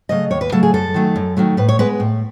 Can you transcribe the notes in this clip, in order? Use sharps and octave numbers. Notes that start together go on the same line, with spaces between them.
C#3 F#3 A3 D#5
D#2 C#5
B4
C#3 F#3 A3 A4
G#4
F#2 A4
D#3 F#3 A3
F#2
D#3 F#3 A3
A2 B4
C#5
G#3 B3 B4
A2